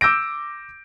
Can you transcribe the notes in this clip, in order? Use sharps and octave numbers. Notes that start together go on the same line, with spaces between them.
D6 E6 G6 A#6 D7